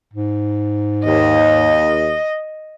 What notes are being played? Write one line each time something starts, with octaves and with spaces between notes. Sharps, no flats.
G#2
D#2 D#5